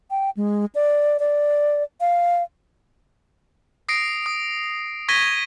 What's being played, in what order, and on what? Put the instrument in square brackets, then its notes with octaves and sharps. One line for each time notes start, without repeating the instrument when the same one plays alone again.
[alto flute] G5
G#3
D5
D5
F5
[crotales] D#6 A#6 C7 D7
D#6
C#6 G#6 A#6 B6 D#7 G7